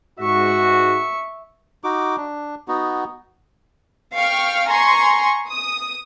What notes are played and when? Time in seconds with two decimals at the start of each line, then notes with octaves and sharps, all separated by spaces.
0.20 G#2 F#4 E5 C#6
1.84 D#4 F#4 D6
2.17 D4
2.68 B3 D#4 F#4
4.17 F5 G5 C#6 F6
4.69 G#5 A#5 C6 C#6
5.49 D#6